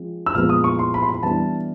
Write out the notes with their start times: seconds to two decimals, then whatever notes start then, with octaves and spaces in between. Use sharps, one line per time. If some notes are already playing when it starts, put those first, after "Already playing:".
Already playing: F3 G#3 C4
0.26 E6
0.34 A#2 F3 G#3 B3 F6
0.49 D#6
0.64 C#6
0.79 C6
0.94 B5
1.03 C6
1.09 B5
1.23 E3 G3 B3 D4 A5